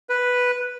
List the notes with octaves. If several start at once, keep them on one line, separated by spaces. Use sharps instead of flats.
B4